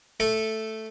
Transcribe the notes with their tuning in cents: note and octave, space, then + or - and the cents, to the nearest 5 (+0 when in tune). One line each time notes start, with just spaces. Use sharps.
A3 +0 A4 +0